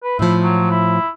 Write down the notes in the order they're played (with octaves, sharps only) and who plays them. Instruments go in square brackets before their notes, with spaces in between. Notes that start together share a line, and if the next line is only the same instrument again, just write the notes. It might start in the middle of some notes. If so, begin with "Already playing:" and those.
[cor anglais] B4
[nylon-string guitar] A2 F3 [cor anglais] E4
[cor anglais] F#3
E4